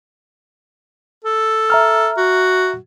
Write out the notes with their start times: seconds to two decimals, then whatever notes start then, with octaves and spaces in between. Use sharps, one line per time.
1.24 A4
1.70 E5 A#5 F6
2.17 F#4